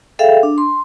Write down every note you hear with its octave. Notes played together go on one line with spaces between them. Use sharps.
G#4 A4 E5 F5 G5
D4
C6